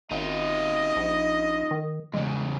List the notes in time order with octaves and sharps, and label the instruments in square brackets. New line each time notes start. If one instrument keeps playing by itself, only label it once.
[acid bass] G#1 [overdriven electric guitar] D#4 F4 [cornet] D#5
[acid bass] A#1
D#3
[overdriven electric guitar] E2 C#3 [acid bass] G#3